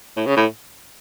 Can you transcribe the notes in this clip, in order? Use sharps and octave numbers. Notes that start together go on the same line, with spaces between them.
A2
C#3
A2